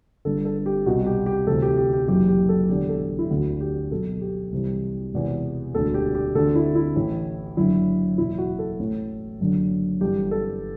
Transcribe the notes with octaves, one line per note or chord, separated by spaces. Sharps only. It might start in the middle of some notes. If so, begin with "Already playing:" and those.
G1 G2 D3 A4
A4
G4
C2 B2 F#4
G4
G4
D2 C3 E3 A4
G4
G4
G4
F#1 F#2 E3 G4
G4
A4
E1 E2 D3 G4
A4
E4
D2 D3 F#4
G4
B1 B2 A4
G4
C2 C3 E3
E1 E2 C3 E3
E1 D2 D3 A4
G4
G4
D2 D3 A4
E4
E4
A1 A2 E3
F#1 F#2 D3 E4
F#1 E2 B2 E4
F#4
A4
A1 A2 E3
F#1 F#2 D3
G1 G2 E3 G4
A4